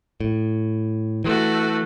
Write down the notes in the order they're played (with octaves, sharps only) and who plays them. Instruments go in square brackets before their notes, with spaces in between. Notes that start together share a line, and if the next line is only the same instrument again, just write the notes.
[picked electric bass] A2
[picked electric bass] E3 [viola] A3 F#4